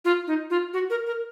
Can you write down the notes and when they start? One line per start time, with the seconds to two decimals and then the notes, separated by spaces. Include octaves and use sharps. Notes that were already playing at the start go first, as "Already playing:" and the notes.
0.05 F4
0.27 D#4
0.50 F4
0.73 F#4
0.90 A#4
1.07 A#4